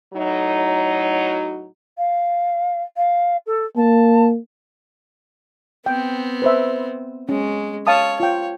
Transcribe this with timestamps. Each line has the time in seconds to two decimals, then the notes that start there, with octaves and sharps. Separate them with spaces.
0.14 A2 F#3 D#4
1.98 F5
2.97 F5
3.46 A4
3.77 A#3 A5
5.86 B3 C4 G5
6.42 B4 C5 E5
7.29 G#3 C#4
7.87 C#5 F5 A5 D#6
8.20 F4 C#5 G5